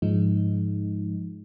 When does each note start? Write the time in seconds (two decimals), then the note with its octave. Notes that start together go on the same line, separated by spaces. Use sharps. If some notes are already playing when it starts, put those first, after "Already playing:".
0.02 G#2 F3 G#3 D#4